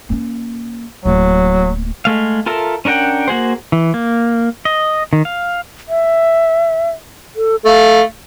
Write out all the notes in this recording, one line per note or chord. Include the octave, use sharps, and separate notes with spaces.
A#3 C#4
D1 F#3 A#3
G#3 A3 F5
F4 A4 A#4 E5
C#4 D4 A#4 F#5 G5
A#3 F#4 G#4 C5
E3
A#3
D#5
D#3
F5
E5
A4
A3 F5